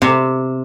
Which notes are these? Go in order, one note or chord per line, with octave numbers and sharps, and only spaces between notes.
C3